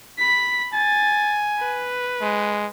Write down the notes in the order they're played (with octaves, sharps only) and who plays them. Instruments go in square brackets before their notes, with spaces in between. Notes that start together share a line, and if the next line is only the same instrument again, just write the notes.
[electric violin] B5 B6
[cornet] G#5 [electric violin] A6
[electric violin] B4
[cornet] G#3